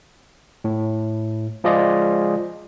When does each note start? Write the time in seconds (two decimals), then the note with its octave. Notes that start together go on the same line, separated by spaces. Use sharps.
0.64 A2
1.64 F3 G#3 F4 G#4 D5 D#5